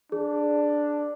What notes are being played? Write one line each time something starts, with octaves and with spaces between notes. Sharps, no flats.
D4 G#4